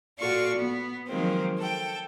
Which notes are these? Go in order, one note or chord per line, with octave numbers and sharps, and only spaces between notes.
A#2 F4 F#4 A4 D5 C#6
B3
D#3 F3 F#3 G#3 A#3 C4
A4 G5